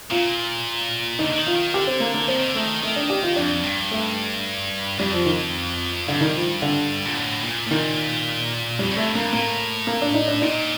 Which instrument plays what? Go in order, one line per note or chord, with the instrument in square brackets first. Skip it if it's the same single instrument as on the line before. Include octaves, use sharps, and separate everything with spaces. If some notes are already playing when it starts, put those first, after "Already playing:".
[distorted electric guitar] A#2 [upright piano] F4
[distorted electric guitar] D3 [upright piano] D#4
[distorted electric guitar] D3
D#3
[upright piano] F4
[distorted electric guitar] D#3
[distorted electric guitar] D3 [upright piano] G4
[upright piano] C4
A#3
A#3
[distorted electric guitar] F3 [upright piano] C4
[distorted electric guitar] D#3
D3
[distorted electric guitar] D#3 [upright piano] A3
[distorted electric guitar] D#3 [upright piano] A3
[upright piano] D4
G4
F4
[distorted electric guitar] F2 [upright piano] D4
[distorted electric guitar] G2
[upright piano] A3
[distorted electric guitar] F2 [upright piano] G3
[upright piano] F3
D#3
[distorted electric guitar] G2 [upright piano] D3
[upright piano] D#3
F3
D3
[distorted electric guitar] A#2
A2
A#2
A2
[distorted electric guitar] A#2 [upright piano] D#3
[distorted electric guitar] F2 [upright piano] G3
[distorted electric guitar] A2
[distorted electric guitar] G2 [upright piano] A3
[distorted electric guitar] G2 [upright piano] A#3
[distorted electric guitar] A2 [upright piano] A#3
[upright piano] A#3
D4
D#4
D4
[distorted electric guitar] A#2 [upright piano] D#4